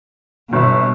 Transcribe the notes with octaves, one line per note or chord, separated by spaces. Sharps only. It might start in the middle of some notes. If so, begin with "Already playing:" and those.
G1 B2 E5